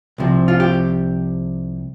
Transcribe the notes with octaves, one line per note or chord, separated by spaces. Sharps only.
C2 C3 F3
F4
G4